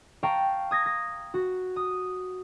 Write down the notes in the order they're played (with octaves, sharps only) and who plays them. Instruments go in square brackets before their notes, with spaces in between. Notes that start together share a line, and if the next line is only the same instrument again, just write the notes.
[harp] F5 G5 A5 A#5 C#6
D#6 G#6 A#6
A#6
F#4
D#6